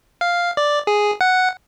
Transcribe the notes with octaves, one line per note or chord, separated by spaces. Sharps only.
F5
D5
G#4
F#5